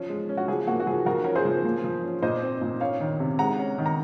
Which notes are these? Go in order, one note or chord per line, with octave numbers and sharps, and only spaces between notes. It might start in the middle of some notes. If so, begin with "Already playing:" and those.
Already playing: F3 C#4
G#3
C#4
F#4
F3 G#4
A#3 F#4
F#4
F3 G#4
F3 F#4 A#4
C#4 A#4
G#4 C5
F3
A#3
F3
C#4
A#2 C5 D#5
C4
A#2
C#4 C#5 F5
D#3
C3
G#3 F#5 A#5
C#4
D#3
A#5